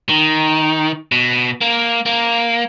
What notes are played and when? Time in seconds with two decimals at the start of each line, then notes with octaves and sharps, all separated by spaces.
0.09 D#3
1.12 B2
1.61 A#3
2.06 A#3